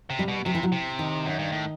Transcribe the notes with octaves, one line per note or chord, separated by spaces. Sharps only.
C3
G3
B2
C3 F#3
E3
F#3
C3
D#3
F#2
G2
A2